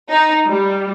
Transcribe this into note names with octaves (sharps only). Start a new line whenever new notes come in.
D#4
G3